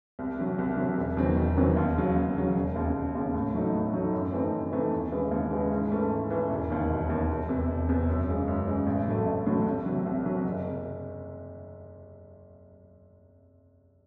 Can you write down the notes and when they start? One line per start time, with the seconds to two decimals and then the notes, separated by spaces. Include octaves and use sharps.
0.19 C2
0.39 C3 F#3
0.58 C2
0.77 C3 F#3
0.97 E1
1.17 E2 D#3 F#3 C4
1.37 E1
1.57 E2 D#3 F#3 C4
1.76 D#2
1.96 C#3 F#3
2.16 D#2
2.36 C#3 F#3
2.56 E1
2.76 D#2 C#3
2.94 E1
3.15 D#2 C#3
3.34 A2
3.54 F#3 A3 D#4
3.74 A2
3.93 F#3 A3 D#4
4.13 F#2
4.33 E3 A3 C4 D#4
4.52 F#2
4.73 E3 A3 C4 D#4
4.93 D#2
5.12 C#3 E3 G#3
5.31 D#2
5.51 C#3 E3 G#3
5.72 G#2
5.90 E3 A3 C#4
6.10 G#2
6.30 E3 A3 C#4
6.50 E1
6.70 D#2 D#3
6.90 E1
7.10 D#2 D#3
7.30 E1
7.49 E2 C3
7.69 E1
7.89 E2 C3
8.09 F#2
8.28 C#3 G#3
8.48 F#2
8.67 C#3 G#3
8.87 A1
9.07 A2 F#3 A3
9.26 A1
9.46 A2 F#3 A3
9.66 C2
9.86 C3 F#3
10.06 C2
10.25 C3 F#3
10.46 F#1
10.69 C3